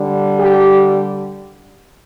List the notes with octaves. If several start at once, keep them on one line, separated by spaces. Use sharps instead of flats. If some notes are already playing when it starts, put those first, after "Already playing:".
Already playing: D3 G3
G4